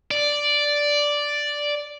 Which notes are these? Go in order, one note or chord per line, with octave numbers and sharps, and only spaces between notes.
D5